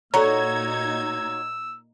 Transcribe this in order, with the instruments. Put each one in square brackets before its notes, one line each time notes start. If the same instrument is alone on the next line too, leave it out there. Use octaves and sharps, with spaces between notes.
[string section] A#2 D#4 G#6 [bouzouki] F#4 C#5 [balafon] A4 A#5 [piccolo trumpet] E6